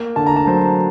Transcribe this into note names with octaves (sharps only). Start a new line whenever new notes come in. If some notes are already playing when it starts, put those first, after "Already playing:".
Already playing: A#3
D3 A5
A#5
A5
F#3 C5